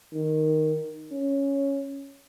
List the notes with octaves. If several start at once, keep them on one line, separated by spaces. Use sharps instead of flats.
D#3
C#4